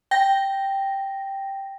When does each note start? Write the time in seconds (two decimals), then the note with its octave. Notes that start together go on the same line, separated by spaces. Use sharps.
0.11 G5 A#6